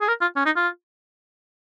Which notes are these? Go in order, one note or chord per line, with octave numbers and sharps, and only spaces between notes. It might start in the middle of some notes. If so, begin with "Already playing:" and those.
G#4
A#4
F4
C#4
D#4
F4